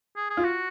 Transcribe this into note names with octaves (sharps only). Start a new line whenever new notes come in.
G#4
G#4
F4
F#4